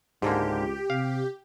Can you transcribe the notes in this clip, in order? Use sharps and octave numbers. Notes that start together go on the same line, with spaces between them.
C#2 G#2 D3 A#3 G4
C3 F5